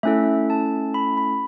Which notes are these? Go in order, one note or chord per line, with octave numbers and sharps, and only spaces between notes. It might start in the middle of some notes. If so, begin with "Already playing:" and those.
A3 C#4 E4 A4 E5
A5
B5
B5